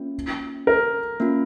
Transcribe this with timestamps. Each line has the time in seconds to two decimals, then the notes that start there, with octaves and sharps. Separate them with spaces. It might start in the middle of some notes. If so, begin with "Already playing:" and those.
Already playing: A#3 C#4 F4
0.67 A#4
1.20 A#3 C#4 F4